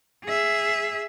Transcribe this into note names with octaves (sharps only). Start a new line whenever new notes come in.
G#4 E5